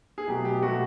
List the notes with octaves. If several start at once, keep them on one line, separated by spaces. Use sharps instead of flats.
G#4
B2 F#3 A3 G4
G4
B2 F#3 A3 F#4